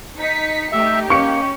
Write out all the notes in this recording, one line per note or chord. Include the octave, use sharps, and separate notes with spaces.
D#4 B6 C#7
A3 D#4 G4 E5
A#3 C#4 C#6 C#7